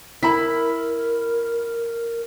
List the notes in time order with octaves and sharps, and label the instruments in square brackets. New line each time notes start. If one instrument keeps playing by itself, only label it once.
[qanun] E4 [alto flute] A#4 [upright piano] B5 B6